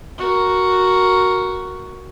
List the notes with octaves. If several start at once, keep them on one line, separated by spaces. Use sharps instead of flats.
F#4 A#4